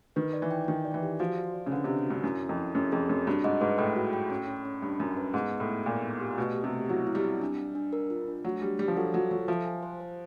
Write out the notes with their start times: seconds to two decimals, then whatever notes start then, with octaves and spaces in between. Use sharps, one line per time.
0.16 D#3 B4
0.33 D5
0.42 E3
0.51 G5
0.68 D#3 G5
0.85 D5
0.94 E3
1.02 G4
1.19 F3 F#4
1.37 D5
1.54 D5
1.66 C#3
1.72 D3 B4
1.84 C3
1.89 D4
2.06 G2 F#4
2.23 F#2 E4
2.41 C4
2.49 F2
2.58 E4
2.75 F#2 G#4
2.92 F2 G#4
3.09 F#2 C4
3.27 G2 F#4
3.44 G#2 D#5
3.61 G#2 B4
3.78 A2 G5
3.96 F#4
4.13 G5
4.30 C#4
4.48 C#4
4.65 C#4
4.82 G2 C#4
4.99 F#2 C#4
5.17 B4
5.34 G#2 B3
5.51 B3
5.60 A2
5.68 B3
5.86 A#2 D#4
6.03 B3
6.20 G4
6.37 B2 A3
6.55 G4
6.64 C3
6.72 A3
6.89 F#3 E4
7.07 E4
7.15 G3
7.24 C4
7.41 D4
7.58 D4
7.75 D4
7.93 A#4
8.10 F4
8.28 D4
8.45 F#3 A3
8.61 G3 D4
8.79 G3 D4
8.88 F3
8.96 F#3 A4
9.14 F#3 F4
9.31 F#3 A4
9.48 F3 E5
9.65 G#5
9.83 C5
10.00 C5